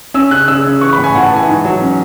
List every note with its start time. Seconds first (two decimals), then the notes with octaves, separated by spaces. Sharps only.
0.14 C#4 E6
0.31 C#3 F#6
0.48 C#3 E6
0.64 C#3
0.81 E3 C#6
0.93 B5
0.98 A2
1.04 G#5
1.15 A2 F#5
1.26 A5
1.31 E3
1.36 G#5
1.48 G#2
1.65 F#3
1.81 C#4